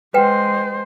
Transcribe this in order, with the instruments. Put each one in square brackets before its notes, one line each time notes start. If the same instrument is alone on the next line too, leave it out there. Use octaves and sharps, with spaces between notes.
[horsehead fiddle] G#3 C5 [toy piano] B4 F#5 G5